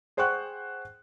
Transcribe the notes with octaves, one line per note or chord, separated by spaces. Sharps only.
G#4 C5 F#5 G5 C#6 F#6